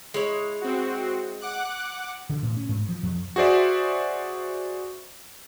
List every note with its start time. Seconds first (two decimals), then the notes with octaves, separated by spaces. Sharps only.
0.14 G#3 E4 C#5
0.61 C4 F#4
1.41 F#5 D6 F#6
2.29 D3
2.43 A2
2.57 C#4
2.69 G#2
2.89 F3
3.03 F2
3.36 F#4 G#4 C5 D5 E5